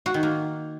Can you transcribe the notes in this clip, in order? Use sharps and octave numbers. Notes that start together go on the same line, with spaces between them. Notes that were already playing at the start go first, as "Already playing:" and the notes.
F#4
D#3
A#3